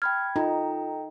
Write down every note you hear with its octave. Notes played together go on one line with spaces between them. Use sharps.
G5 B5 F6 G#6
D#4 F4 A4 G5 A#5